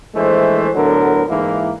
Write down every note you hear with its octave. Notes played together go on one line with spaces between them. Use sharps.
A#1 E3 G#3 A3 C5
A2 D3 F#3 B3 D4 A#4
G#2 E3 G#3 A#3 D#4 E4